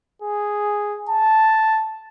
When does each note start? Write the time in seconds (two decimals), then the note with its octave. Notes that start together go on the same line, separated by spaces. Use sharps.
0.22 G#4
1.09 A5